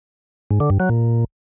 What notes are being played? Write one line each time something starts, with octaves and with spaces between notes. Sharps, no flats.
G#2
D3
G2
F#3
A#2